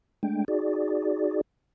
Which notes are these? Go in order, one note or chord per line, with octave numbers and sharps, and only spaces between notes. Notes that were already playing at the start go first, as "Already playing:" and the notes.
G#3 A3 D4 G5
D#4 F#4 G#4 D5